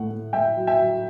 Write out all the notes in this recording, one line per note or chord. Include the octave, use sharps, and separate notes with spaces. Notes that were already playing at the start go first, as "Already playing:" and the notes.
Already playing: A2 A3 F#5
A3
A2 E5 G5
F#3
E5 G5
F#3